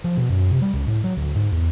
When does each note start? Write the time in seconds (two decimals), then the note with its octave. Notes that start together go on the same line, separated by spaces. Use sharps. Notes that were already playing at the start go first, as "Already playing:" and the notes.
0.04 F3
0.17 B2
0.30 F#2
0.51 C3
0.62 G3
0.74 C#2
0.87 A2
1.04 F#3
1.17 D2
1.35 G#2
1.51 E2